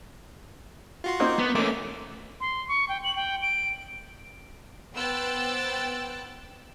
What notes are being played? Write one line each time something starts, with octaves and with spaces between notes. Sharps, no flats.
F4 F#4 C6
A#3 C4 D#4
B3
A3 A#3 C#4 D6
C6
C#6
G5
F#7
G5
D7
B3 C5 G5 E6 F#6 A6